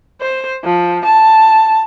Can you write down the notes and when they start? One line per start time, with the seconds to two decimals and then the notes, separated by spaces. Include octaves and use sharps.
0.21 C5
0.64 F3
1.05 A5